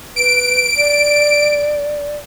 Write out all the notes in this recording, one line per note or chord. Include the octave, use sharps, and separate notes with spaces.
B4 D7
D5